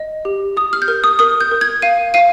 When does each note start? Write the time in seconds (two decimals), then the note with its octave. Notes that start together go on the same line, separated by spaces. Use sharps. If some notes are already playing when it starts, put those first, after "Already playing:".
Already playing: D#5
0.25 G4
0.57 G4 D#6
0.73 F6
0.82 G6
0.88 A#4 F6
1.04 D#6
1.19 A#4 D#6
1.41 G6
1.51 A#4
1.61 G#6
1.82 F5 D#7
2.14 F5 D#7